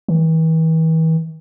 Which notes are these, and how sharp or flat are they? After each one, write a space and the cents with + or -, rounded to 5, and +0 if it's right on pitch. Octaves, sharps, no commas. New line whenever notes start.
E3 -40